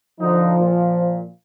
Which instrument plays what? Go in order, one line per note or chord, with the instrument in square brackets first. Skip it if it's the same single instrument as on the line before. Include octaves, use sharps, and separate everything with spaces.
[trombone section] D3 D#4 [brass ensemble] F3
[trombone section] A#2